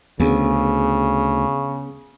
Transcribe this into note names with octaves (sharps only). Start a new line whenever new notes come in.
D2 C#3 B3 C#4 G#4